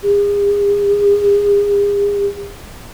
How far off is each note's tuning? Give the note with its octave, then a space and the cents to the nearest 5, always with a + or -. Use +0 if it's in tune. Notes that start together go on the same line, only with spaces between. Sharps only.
G#4 -40